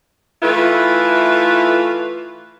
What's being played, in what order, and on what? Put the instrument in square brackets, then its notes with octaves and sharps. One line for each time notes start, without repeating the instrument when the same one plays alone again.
[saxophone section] E3 A3 E4 F4 B4